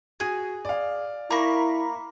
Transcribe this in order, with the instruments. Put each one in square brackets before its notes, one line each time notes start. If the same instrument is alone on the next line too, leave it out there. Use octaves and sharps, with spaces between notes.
[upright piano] F#4 [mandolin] G#4
[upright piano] D5 F5
[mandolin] A#3 C#6 [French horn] E4 [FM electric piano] A#5 B5